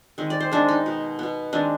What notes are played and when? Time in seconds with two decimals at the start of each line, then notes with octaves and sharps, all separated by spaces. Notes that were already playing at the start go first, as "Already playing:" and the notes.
0.18 D#3 G#3 C4
0.30 D5
0.40 C5
0.52 D#3 G#3 C4 D4
0.69 D#4
0.86 B2 B3
1.19 B2 B3
1.53 D#3 G#3 C4 D4